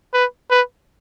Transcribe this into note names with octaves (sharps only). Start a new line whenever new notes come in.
B4
B4